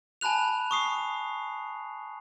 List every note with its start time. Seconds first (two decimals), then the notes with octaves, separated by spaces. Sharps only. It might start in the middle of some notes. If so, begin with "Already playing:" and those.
0.21 G#5 A5 B5 F#6 F7
0.71 C#6 D#6 C7